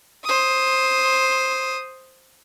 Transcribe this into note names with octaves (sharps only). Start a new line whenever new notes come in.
C5 D#6